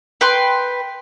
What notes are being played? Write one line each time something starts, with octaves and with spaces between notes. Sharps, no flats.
B4 G5 C6